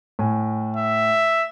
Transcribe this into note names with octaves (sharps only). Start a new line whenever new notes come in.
A2 G#5
E5